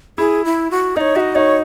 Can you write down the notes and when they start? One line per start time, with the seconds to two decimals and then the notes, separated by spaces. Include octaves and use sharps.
0.18 E4 G#4
0.45 E4
0.71 F#4
0.96 D#4 D#5
1.01 C#5
1.16 F#4 E5
1.20 D#5
1.35 D#4 C#5